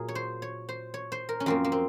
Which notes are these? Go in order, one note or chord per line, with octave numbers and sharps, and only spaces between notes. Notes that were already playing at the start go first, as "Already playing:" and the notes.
Already playing: A#2 F#3 G#4 A#4
C#5
C5
C#5
C5
C#5
C5
A#4
C#4
F#2 F3 A#3 C4
A#3
C4